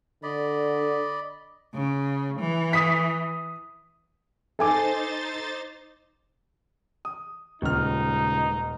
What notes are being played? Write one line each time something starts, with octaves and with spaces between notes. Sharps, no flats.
D3 D5 D#5 B5
C#3
E3
D#6 B6
D#4 A4 C5 G#5 D6 A6
D#6
D#1 C#2 D#4 F6